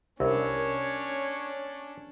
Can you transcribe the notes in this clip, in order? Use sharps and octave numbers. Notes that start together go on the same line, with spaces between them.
C2 C#4 D4 A#4 C#5 B5